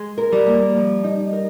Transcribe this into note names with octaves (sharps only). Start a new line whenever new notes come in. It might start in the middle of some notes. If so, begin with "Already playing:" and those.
Already playing: G#3
A#4
G3
A#3
F3
D#4
A#4